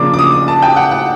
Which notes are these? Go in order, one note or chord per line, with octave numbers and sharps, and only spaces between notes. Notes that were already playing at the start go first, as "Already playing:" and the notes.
Already playing: C#3 F3 A#3 D4 D6
D6
D#6
A5
G5
F#5
F#5